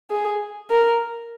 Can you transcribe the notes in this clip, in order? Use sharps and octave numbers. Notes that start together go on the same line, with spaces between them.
G#4
A#4